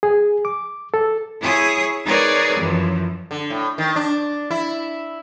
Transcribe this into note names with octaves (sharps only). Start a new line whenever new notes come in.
G#4
D6
A4
E4 G#4 C#5 G#5 D#6
D#4 G#4 A#4 B4 C#5 D5
F#2 E3 F3
D3
A2
D#3
D4
E4